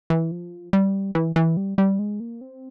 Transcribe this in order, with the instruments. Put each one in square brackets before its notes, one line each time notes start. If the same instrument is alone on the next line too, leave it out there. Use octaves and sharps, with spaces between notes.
[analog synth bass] E3
F3
G3
E3
E3
G3
G3
G#3
A#3
C4